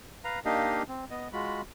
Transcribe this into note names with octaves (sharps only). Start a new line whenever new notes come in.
B4 F5 A#5
A#3 D4 D#4 G4 D#5 F5
C4
B3 D#5
G#3 F4 F#4 B5